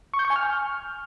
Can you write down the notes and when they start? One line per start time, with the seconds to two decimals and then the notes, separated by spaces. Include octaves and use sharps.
0.14 C#6
0.19 G6
0.25 C#6
0.30 G#5
0.36 F6